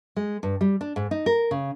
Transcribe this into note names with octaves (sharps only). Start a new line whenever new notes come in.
G#3
G2
G3
D4
G#2
D#4
A#4
C#3